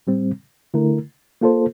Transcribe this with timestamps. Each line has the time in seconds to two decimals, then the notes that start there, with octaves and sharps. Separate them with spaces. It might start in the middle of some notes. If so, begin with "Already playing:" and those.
0.07 A2 G3 C4
0.74 D3 A3 E4 A#4
1.41 A#3 F4 A4 C5